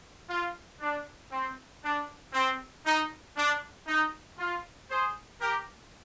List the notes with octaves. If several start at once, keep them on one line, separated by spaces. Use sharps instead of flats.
F4
D4
C4
D4
C4
D#4
D4
D#4
F4
G#4 C5
G4 A#4